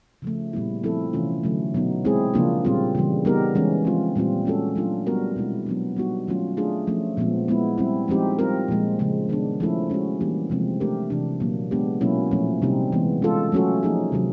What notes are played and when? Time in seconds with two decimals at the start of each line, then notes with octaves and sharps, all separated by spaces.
0.22 C#3 F3 A3
0.53 A#2 G3 B3 E4
0.83 F3 A3 C4 E4 A4
1.13 C3 E3 A3 C#4 F4
1.43 D3 F#3 A3
1.74 B2 F#3 B3 D#4
2.05 G#3 C4 E4 G#4
2.34 C#3 F3 A#3 D4 F4
2.65 A#2 G3 C4 F4
2.95 C#3 E3 G3
3.25 G3 B3 D#4 G4 A#4
3.55 E3 G#3 C#4
3.85 F3 G#3 C4 F4
4.16 A#2 G3 C4 F4
4.45 G#3 C#4 F#4 A4
4.75 F#3 A3 D4 F4
5.06 G3 B3 D4 F#4 A#4
5.36 B2 G#3 C4 E4
5.66 F#3 B3 D4
5.96 G3 B3 D#4 F#4
6.27 D#3 F#3 A3 C#4 F4
6.57 A3 D4 F4 G#4
6.87 F3 A3 C#4
7.17 A#2 F3 G#3 B3
7.48 G#3 B3 E4
7.78 G3 C4 E4
8.08 F3 G#3 C4 D#4 G4
8.39 G3 C4 F4 A#4
8.68 A#2 F3 G#3
8.99 C#3 F3 G#3
9.29 D#3 G#3 B3 D4
9.60 F3 A3 C#4 E4 A4
9.90 G#3 C#4 F#4
10.20 E3 G3 A#3 D4 G4
10.50 C3 F3 G#3 C4
10.80 A3 D4 G4 A#4
11.10 C3 E3 A3 D4
11.40 A#2 F#3 A#3
11.71 G#3 B3 D4 G4
12.01 B2 F#3 A#3 C#4 E4
12.31 A#2 F3 A3 C#4
12.62 C3 D#3 G3 C4 D#4
12.92 E3 G#3 B3
13.22 G#3 C#4 F4 A4
13.52 F#3 A3 C#4 F#4 A4
13.83 F3 A#3 D#4 G#4
14.12 C3 D#3 F#3